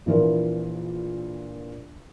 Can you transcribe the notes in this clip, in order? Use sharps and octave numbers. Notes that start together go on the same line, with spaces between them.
A#1 A#2 E3 F4 A#4